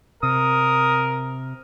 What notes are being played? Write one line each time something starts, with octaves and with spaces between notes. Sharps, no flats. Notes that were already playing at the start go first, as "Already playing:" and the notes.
C3 A#4 D#6